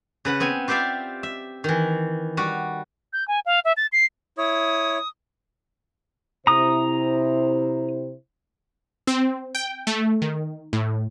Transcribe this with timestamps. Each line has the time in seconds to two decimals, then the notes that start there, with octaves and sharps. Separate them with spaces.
0.25 C#3 B4 F#5
0.40 B3 C4 G#5
0.68 F4 G4 C5 D5 E5 F5
1.23 E5
1.64 D#3 E3
2.37 G3 F#4
3.13 G6
3.28 G#5
3.46 F5
3.65 E5
3.77 A6
3.92 C7
4.38 E4 C#5 D#6
6.47 C3 E4 C5 A#5 D#6
9.07 C4
9.55 G5
9.87 A3
10.22 D#3
10.73 A2